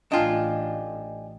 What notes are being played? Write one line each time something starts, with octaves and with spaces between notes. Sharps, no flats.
A1 D4 F4 D#5 G5 G#5